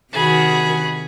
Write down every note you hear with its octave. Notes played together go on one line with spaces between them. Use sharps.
C3 D#3 F#4 G#4 B5